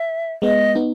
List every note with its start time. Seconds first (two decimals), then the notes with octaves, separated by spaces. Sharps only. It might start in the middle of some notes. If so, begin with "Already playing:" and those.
Already playing: E5
0.42 G#3 B3 D#5
0.75 B3 D#4